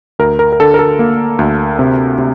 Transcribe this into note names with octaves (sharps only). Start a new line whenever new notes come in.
D2 A#4
A#4
A#4
D3 A4
A#4
A4
A#3
D2
C3
C3